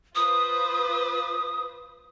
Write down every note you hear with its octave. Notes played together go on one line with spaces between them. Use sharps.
F4 B4 C5 D#6